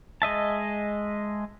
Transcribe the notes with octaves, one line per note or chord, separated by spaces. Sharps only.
G#3 D#5 E5 A5